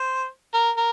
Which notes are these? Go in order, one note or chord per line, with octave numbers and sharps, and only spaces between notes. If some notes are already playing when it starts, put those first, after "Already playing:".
Already playing: C5
A#4
A#4